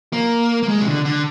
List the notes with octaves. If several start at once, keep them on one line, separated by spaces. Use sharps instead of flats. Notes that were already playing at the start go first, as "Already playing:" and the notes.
A#3
A#3
G#3
C3
D3
D3